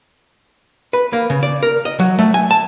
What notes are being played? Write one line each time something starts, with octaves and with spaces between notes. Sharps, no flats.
B4
A#3
C#3
D5
A#4
D#5
F#3
A3
G#5
A5